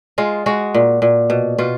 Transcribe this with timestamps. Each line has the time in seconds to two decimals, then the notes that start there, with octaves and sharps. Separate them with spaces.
0.18 G#3 F4
0.46 G#3 F#4
0.74 A#2
1.02 A#2
1.30 B2
1.58 B2 F4